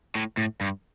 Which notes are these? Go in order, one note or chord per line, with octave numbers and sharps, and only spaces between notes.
A2
A2
G2